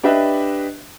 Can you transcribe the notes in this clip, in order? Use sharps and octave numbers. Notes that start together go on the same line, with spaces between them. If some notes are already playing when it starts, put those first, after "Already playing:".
D4 G4 B4 D#5 E5 G5